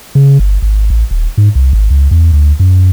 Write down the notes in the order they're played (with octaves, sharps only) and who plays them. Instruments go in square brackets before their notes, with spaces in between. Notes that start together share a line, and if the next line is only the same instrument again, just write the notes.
[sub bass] C#3
G1
G#1
A1
D#1
G#2
C2
G#1
C#2
E2
D2
F#2